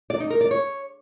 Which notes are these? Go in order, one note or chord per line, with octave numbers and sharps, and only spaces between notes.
D5
D#4
A#4
D5
C#5